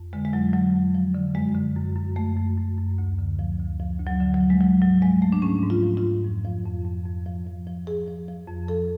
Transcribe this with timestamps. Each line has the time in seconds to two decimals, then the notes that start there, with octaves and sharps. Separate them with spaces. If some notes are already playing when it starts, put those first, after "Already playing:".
Already playing: F2
0.13 D3 G#3
0.25 G#3
0.33 F2 F#3
0.53 D3 F#3
0.74 F2
0.95 F3
1.15 D3
1.35 F#2 G#3
1.55 D3
1.76 F#2
1.96 F#2
2.16 F#2 A3
2.37 F#2
2.57 F#2
2.78 F#2
2.98 D2
3.19 D3
3.39 F3
3.60 D2
3.80 F3
4.00 D2
4.07 F#3
4.20 D3
4.34 F#3
4.41 F3
4.50 G#3
4.61 F3 F#3
4.81 G#2 F#3
5.02 F3 G#3
5.22 F3 A3
5.33 D4
5.42 G#2 C#4
5.63 G#2
5.70 F4
5.83 F3
5.97 F4
6.03 G#2
6.24 F2
6.45 F3
6.65 F2
6.86 F2
7.06 F2
7.26 F3
7.47 F3
7.67 F3
7.87 F3 G#4
8.08 F3
8.28 F3
8.48 F2
8.68 F3 A4